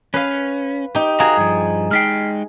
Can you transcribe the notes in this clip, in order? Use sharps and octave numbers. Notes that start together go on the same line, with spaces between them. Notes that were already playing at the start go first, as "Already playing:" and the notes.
C#4 B4 F5
D#4 G4
F#4 G#4 A#4 F5 A#5
G2 F3
G#3 D#4 G5 F6 B6 C7